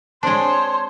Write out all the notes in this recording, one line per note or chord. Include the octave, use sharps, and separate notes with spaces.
G#3 C4 D4 C5 C#5 A5 C6